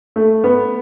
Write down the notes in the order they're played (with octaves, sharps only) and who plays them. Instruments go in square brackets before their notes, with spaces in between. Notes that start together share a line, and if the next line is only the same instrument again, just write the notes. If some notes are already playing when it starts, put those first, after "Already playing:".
[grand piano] A3
B3